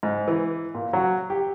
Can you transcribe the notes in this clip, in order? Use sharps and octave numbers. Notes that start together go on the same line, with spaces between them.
G#2
E3
A#2
F#3
G4